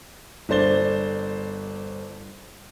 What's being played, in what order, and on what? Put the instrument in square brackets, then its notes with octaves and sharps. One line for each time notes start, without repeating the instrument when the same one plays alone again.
[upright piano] G1 D4 C5 A6 G7